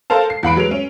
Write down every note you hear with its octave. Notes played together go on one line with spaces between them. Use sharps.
A4 A#4 C5 F5 A5
C7
E2 F#5 B5 D7
F#3 G#3 B4 F7
C#4